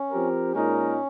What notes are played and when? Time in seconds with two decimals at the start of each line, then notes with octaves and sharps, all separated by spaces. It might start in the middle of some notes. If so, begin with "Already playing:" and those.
Already playing: C#4
0.11 F3 C4 G4 A#4
0.54 A#2 G#3 C#4 D#4 A#4